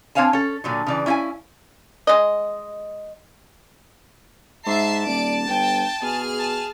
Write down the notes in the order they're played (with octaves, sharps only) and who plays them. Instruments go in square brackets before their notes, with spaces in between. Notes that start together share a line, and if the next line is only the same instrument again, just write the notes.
[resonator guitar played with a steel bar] C4 D4 C#5 F5 G#5 A5
C#4 A4
A#2 D3 F#3
C#3 E3 D5
C#4 E4 D#5 F5 G#5
[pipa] G#3 D#5
[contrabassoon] G#2 [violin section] E5 C7 [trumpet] A5
[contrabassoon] D#1 [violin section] D5 D7
[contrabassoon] G1 [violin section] G5
[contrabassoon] B2 [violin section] G#4 F6
[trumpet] A5